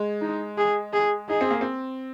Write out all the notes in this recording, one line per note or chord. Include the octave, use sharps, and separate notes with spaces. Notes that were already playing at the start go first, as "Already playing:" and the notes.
Already playing: G#3
D#4
G#4
G#4
D#4 G#4
C4
A#3
C4